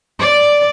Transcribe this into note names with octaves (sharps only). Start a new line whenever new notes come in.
D5